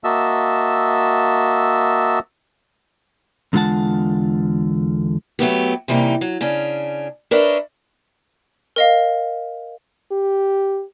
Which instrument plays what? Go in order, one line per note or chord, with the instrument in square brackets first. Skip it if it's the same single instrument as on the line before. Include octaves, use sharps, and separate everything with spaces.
[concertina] A#3 F#4 D#5 E5 A5 E6
[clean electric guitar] E2 D3 G#3 F4 F#5 A5
[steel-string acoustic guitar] F#3 A3 B3 G4
C3 E3 G3 A#3 D#4
F#3
C#3 C#4 D4
D4 A#4 B4 C#5 D#5 E5
[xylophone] A#4 D#5 F5
[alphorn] G4